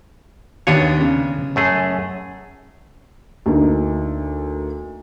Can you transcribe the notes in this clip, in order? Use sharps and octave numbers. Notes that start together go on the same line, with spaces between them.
D#2 B3 D4 C#5 D#7
C#3
F#2 A3 G#4
D2 A#3 D#4